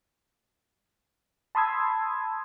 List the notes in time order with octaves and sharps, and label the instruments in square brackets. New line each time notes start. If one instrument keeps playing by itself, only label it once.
[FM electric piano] A5 B5 C6 D#6 E6 G#6